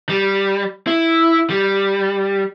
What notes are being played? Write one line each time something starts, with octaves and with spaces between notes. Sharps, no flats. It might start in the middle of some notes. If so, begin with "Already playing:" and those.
G3
E4
G3